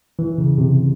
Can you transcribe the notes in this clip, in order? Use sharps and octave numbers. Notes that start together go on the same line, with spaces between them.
E3
C#3
C3